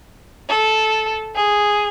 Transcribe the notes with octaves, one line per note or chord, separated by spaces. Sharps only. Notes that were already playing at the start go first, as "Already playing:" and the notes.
A4
G#4